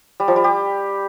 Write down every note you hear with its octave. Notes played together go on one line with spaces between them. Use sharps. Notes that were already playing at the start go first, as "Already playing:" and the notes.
G3
F3
G3
G4